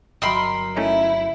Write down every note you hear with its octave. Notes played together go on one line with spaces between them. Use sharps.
G1 F#3 A#4 D#5 E5 G5 B5 C6
A3 C#4 D#4 E4